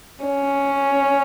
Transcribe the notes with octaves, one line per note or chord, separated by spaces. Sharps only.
C#4